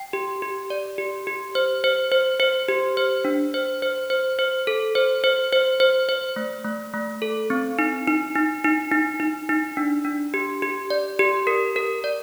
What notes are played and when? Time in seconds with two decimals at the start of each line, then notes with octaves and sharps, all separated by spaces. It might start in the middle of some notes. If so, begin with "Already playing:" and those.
Already playing: G5
0.13 G4
0.42 G4
0.70 D5
0.98 G4
1.27 G4
1.55 C5
1.84 C5
2.12 C5
2.40 C5
2.68 G4
2.97 C5
3.25 D4
3.54 C5
3.82 C5
4.10 C5
4.39 C5
4.67 A4
4.95 C5
5.24 C5
5.53 C5
5.80 C5
6.09 C5
6.36 A3
6.65 A3
6.94 A3
7.22 A4
7.50 C4
7.79 D#4
8.08 D#4
8.35 D#4
8.64 D#4
8.92 D#4
9.20 D#4
9.49 D#4
9.77 D4
10.05 D4
10.34 G4
10.62 G4
10.90 D5
11.19 G4
11.47 A#4
11.76 A#4
12.04 D5